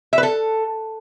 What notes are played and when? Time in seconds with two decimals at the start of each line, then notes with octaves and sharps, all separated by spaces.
0.13 E5
0.18 B4
0.23 A4